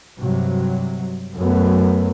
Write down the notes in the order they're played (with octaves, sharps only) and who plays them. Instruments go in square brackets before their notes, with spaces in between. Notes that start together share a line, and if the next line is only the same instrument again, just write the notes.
[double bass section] G2 C3 F#3
[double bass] F#2 A3 [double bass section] F#3 B3